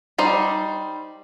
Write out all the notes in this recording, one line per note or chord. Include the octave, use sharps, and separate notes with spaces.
G3 D#4 C5